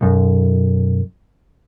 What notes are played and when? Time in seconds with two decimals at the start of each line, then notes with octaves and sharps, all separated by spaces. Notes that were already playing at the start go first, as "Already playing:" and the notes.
0.01 B1 F#2